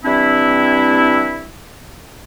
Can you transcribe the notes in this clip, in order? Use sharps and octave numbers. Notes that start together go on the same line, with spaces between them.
E3 G3 C4 D4 E4